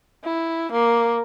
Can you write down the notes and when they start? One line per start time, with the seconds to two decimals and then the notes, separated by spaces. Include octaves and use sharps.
0.24 E4
0.72 A#3